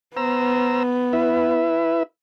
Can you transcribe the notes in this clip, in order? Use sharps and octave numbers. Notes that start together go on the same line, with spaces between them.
B3 C5 A#5 E6
E4 B4 E5